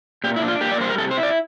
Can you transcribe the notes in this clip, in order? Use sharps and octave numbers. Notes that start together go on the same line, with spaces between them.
A#2 G4
E4
D4
F4
A#3 G4
D5
G3 C5
A#4
C3 A4
C5
E4
D5